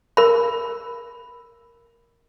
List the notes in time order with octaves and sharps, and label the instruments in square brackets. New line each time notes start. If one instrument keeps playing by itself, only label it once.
[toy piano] A#4 B5